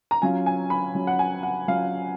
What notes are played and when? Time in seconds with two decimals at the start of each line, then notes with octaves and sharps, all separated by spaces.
0.11 A#5
0.22 F#3 C#4 F4 G#5
0.46 G#5
0.70 B5
0.95 F#3 C#4 F4
1.07 F#5
1.19 G#5
1.43 F#5
1.68 F#3 C#4 F4 F5